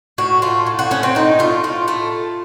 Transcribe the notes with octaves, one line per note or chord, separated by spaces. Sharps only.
A2 F#4
A3 F4
A2
F#4
A3 C#4
C4
A2 D#4
A3 F4
A2 F4
A3